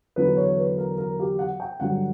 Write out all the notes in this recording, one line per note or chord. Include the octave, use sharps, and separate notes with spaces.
E2 D3 F#3 B4
C#5
B4
A#4
A#4
G4
F#5
G5
G2 D3 F#3 F#5